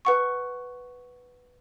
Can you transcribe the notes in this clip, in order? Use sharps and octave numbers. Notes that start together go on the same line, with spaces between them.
B4 F#5 C#6